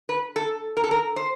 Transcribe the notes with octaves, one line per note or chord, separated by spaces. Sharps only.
B4
A4
A#4
A4
A#4
C5